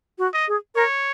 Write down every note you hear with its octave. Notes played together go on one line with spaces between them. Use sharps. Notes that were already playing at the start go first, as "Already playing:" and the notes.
F#4
D#5
G#4
A#4 C#5